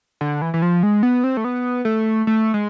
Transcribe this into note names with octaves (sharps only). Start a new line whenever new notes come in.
D3
E3
E3
F3
G#3
B3
C4
A3
B3
A3
A3
G#3